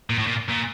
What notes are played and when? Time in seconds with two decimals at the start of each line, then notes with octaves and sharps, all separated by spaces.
0.10 A#2
0.19 A2
0.27 A#2
0.49 A#2